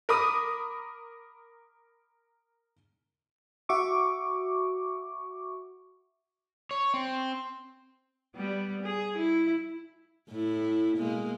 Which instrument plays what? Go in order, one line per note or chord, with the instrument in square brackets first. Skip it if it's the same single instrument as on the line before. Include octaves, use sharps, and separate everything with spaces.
[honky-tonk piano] A#4 B5 D6 D#6
[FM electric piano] F#4 E5 C#6 D6
[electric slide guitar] C#5
C4
[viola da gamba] G3 B3
G#4
E4
A2 E4
B2 G#3 A#3